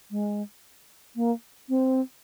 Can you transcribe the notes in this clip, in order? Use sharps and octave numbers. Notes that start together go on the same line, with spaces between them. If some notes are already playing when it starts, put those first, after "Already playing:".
G#3
A#3
C4